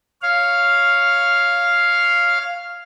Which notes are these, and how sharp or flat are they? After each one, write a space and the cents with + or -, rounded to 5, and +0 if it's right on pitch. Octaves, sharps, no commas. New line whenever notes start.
C#5 +0 F5 +0